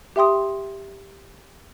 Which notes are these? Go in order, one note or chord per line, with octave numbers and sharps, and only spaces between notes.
G4 E5 G5 C6 D#6